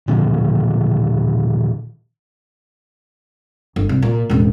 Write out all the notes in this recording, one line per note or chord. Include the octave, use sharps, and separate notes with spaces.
A#2 D3 D#3 F3
G1
C2
A#2
E1 A1